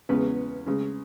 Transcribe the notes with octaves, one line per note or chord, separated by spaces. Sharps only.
E2 C#3 G#3 B3 C#4 B4
C#3 G#3 C#4